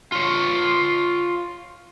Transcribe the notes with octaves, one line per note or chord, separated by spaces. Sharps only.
F4 C#5